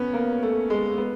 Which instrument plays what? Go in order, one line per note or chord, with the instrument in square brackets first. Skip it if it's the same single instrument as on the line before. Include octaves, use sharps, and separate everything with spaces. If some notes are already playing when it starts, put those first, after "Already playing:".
Already playing: [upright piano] B3 C#4
A#3
A3
G#3
B3